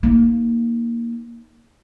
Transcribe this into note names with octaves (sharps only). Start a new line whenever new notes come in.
A#3 D#4